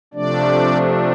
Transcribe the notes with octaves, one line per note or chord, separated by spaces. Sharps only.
C3 F3 A3 D4 D5